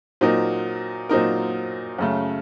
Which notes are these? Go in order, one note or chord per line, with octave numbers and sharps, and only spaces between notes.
A#2 F#3 C4 D#4 A#4
A#2 F#3 C4 D#4 A#4
F#2 C#3 A3